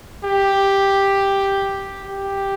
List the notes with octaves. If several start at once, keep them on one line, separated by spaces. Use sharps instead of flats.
G4
G4